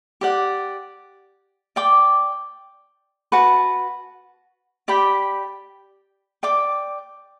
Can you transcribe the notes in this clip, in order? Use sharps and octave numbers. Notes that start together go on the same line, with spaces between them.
G4 D5 F#5
D5 G5 D6
F#4 B4 F#5 A5
G4 D5 G5 B5
D5 G5 D6